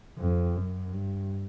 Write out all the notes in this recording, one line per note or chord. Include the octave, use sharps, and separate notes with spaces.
F2
F#2
G2